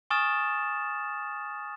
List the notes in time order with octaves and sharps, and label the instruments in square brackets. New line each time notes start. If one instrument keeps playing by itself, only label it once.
[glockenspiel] G#5 C#6 D#6 F6 A6 E7